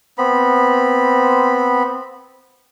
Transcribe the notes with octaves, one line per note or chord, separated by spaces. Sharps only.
B3 C4 B5